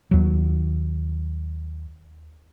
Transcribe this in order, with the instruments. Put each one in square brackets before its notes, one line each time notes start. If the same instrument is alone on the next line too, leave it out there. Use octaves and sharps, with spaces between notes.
[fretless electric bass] D#2 F#3